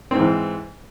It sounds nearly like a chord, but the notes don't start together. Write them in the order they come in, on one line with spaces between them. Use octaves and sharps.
C4 G#2 E3